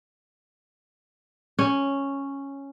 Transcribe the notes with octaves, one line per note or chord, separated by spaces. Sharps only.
C#4